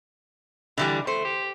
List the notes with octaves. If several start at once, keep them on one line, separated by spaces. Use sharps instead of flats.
D3 E3 G3 E4
A3 C5
G4